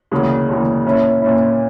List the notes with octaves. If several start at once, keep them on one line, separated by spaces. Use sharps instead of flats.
E1 D2 C#3 E3 A#3
E1 D2 C#3 E3 A#3
A#2 A#3 C#4 E4
A#2 A#3 C#4 E4